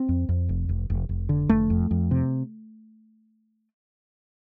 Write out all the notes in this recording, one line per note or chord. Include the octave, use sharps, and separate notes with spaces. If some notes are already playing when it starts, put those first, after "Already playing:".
Already playing: C4
F2
F2
F1
F1
F1
F1
D3
F1 A3
F2
F2
C3